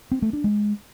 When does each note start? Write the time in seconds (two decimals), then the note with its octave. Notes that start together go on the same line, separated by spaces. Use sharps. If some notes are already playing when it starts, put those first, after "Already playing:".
0.12 C4
0.22 A3
0.33 D4
0.44 G#3